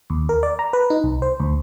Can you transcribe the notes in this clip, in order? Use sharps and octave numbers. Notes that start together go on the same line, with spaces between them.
D#2
A#4
D5
A#5
B4
D#4
C2
C5
D2